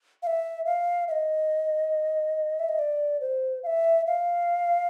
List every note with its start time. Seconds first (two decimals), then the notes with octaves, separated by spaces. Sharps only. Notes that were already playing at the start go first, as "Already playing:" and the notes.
0.23 F5
0.27 E5
0.66 F5
1.08 E5
1.11 D#5
2.60 E5
2.69 D#5
2.79 D5
3.21 C5
3.63 F5
3.67 E5
4.07 F5